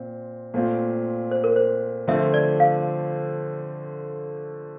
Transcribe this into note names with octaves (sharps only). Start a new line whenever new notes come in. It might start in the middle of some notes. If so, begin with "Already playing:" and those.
Already playing: A#2 C4
A#2 A3 C4 F4
C5
A#4
C5
D3 F3 A3 C4 F4 E5
D5
F5